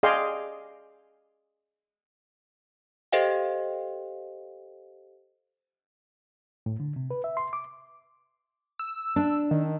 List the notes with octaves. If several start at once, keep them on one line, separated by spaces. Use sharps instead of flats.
G#4 D5 D#5 F5 G5 C6
G4 A4 C5 D#5 F5 G5
A2
D3
C3
B4
E5
C6
D6
E6
D4
D#3